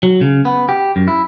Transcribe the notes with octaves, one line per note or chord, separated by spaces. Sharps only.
F#3
C#3
B3
G4
F#2
E4